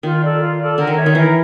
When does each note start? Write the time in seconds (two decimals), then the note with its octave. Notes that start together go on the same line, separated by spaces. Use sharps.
0.03 D#3 F4
0.22 A4 D5
0.40 F4
0.59 A4 D5
0.78 D3 A#4
0.87 D#3
0.97 C#5 E5
1.06 D#3
1.15 E3 A#4